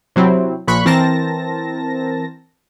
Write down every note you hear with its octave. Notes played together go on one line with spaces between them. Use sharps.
C3 F#3 C4 E4
A#1 A#2 B5 C#6 F#6
E3 C4 A#4 A5 A#6